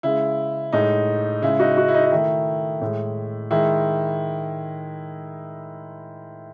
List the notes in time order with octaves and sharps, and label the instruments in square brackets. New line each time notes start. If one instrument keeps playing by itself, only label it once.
[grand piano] C#3 G#3 E4
A2 G#3 D#4
C#3 G#3 E4
D#4 F#4
D#4 F#4
E4
D#4
D#4
D#3 A3 E4
A2 G#3
D#3 G#3 E4